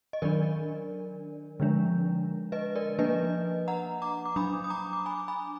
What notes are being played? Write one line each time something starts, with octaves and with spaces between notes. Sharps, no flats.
D#5
D#3 F#3 D4 A#4 D5
D3 F3 G#3 D4
B4 D#5
A#4 D5
F3 A#3 D4 B4 D#5
F#5 A#5
A#5 D6
D6
F#3 D4 B5 D#6
D#6
A#5 D6
D6
G#5 B5
G#5 B5